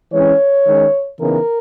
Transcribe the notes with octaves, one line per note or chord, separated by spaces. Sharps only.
E3 G#3 C#4 C#5
D#3 G#3 C#4
C#3 E3 B3 D#4 A#4